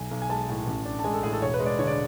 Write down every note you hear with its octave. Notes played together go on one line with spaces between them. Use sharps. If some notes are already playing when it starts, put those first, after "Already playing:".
Already playing: B1 G#5
B1
G#5
G#3 A5
A2
A1
D4
A5
G#3 G#5
A4
A2 G#4
A4
E1 C#5
B4
G#3
D5
D3 C#5
D5